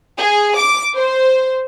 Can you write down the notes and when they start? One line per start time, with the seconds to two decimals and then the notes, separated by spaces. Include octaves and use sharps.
0.18 G#4
0.57 D6
0.96 C5